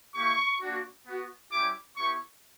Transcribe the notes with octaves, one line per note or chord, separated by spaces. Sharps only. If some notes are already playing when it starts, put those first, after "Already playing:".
A#3 E4 G4 C#6
A#3 D4 F#4
B3 F#4
G3 C#4 E4 G4 D6
B3 E4 G4 C#6